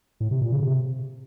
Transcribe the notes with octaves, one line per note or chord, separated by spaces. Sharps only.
A2
C3
A#2
C#3
C3